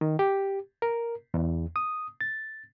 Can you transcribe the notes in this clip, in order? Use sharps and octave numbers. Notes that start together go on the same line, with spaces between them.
D#3
G4
A#4
E2
D#6
A6